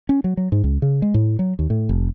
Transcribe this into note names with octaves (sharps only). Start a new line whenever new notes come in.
C#4
F#3
F#3
G#2
C#2
C#3
G#3
A2
F#3
D#2
A2
F1